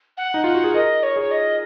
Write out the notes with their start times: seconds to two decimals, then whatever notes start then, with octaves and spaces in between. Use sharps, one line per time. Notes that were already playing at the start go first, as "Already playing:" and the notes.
0.17 F#5
0.34 D#4
0.44 F4 F#5
0.55 F#4
0.64 G#4
0.73 A#4 D#5
1.03 C#5
1.16 G#4 C#5
1.31 D#5